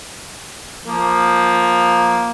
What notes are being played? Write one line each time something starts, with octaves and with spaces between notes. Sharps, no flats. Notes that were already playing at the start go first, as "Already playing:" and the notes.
F3 A#3